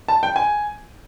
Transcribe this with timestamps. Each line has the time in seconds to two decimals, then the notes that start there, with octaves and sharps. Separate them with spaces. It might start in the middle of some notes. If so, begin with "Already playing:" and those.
0.08 A5
0.23 G5
0.36 G#5